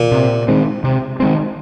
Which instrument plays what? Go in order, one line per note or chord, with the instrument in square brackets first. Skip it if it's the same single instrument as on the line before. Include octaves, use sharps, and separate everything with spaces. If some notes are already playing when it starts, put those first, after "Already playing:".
Already playing: [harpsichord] A#2
[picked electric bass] C3
D#3 G#3 C4
C3
D#3 G#3 C4